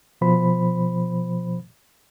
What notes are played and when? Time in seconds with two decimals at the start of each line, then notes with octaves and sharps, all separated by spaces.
0.21 B2 F3 C5 B5